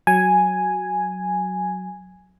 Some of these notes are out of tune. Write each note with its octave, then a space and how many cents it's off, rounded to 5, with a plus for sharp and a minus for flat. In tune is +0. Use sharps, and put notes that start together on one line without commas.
F#3 +0 G#5 +0